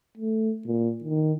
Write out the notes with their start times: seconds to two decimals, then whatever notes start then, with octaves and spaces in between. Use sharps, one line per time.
0.17 A3
0.66 A#2
1.04 D#3